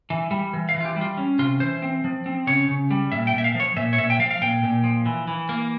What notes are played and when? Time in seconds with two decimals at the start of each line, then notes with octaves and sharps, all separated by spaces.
0.10 E3
0.31 G3
0.53 E3
0.69 F5
0.74 E3
0.80 F4
0.85 G4
0.96 G3
1.01 F4
1.17 C#4
1.39 C3 F4
1.60 E3 C5
1.82 C4
2.04 F3
2.26 C4
2.47 C#3 C#5
2.68 C#3
2.91 G3
3.12 A#2 E5
3.27 G5
3.33 A#2
3.38 E5
3.44 F5
3.55 F3 C#5
3.76 A#2 E5
3.93 C#5
3.98 A#2 E5
4.10 G5
4.19 F3 F5
4.31 F5
4.41 A#2 G5
4.63 A#2
4.84 F3
5.06 E3
5.27 E3
5.49 A#3